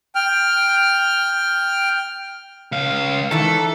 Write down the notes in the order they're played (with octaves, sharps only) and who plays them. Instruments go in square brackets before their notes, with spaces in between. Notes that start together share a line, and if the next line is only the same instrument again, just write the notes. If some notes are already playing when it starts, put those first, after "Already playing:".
[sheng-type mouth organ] G5 F6
[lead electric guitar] C#2 F5
[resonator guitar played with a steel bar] D#3 E3 B4 [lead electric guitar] A4